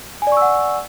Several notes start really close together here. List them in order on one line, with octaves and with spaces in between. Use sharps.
G#5 D5 C#6 E6 F#5